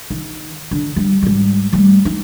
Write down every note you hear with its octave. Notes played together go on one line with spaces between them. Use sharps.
D#3
D3
G3
G#2 G3
G3 A3
D#4